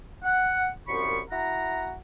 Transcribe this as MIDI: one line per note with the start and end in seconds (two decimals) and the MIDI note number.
0.24 0.68 78
0.88 1.20 36
0.88 1.20 42
0.88 1.20 53
0.88 1.20 83
0.88 1.20 85
1.30 1.94 64
1.30 1.94 66
1.30 1.94 78
1.30 1.94 82